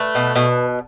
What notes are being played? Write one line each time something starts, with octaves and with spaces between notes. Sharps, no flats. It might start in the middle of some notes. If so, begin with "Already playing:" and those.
Already playing: A3 B4
B2
B2